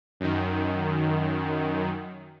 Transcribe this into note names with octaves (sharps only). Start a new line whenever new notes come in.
F#2 D#3